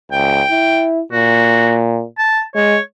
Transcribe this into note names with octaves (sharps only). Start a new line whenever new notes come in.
C#2 G5
E4
A#2 F#4
A5
G#3 C#5